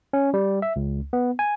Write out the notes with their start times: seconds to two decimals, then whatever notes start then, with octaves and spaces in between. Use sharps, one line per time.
0.13 C#4
0.34 G3
0.62 E5
0.76 C#2
1.13 B3
1.39 G#5